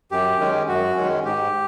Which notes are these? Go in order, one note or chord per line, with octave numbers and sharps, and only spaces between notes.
F#2 G4
D#3 G#3 C#4
F#2 F#4
D#3 G#3 C#4
G#2 G4